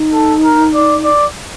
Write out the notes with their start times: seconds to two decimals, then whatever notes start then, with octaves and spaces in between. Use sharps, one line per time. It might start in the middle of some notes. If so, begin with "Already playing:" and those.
Already playing: D#4
0.13 A4
0.44 A#4
0.74 D5
1.04 D5